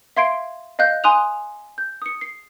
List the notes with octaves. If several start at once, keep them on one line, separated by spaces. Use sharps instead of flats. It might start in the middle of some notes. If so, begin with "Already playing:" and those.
E5 F5 C6 G#6 C7 D7
D#5 F5 F#6 G6
G#5 C6 D#6 F#6 F7
G6
D#6 C#7
C7